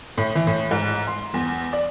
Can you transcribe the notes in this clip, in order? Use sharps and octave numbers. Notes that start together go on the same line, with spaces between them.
A2
E3
A2
G#2
C6
E2
D5